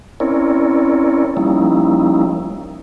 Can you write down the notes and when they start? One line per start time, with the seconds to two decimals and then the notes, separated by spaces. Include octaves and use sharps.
0.20 C4 C#4 E4 A#4 C#5 D5
1.37 F3 G3 A#3 C#4 D#4 E4